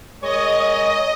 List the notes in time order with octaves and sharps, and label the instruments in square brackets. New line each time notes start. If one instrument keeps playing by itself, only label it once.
[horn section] G#3 A#4 C#5 [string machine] D#5